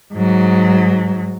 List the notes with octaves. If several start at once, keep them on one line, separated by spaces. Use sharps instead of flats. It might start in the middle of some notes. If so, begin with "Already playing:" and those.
G#2 F#3